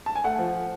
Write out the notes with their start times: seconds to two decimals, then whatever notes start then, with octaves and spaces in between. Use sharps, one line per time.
0.06 A5
0.15 G#5
0.24 A3 F#5
0.38 F3